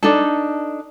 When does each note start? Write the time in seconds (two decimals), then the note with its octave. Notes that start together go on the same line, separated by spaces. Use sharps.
0.03 D4 D#4 A4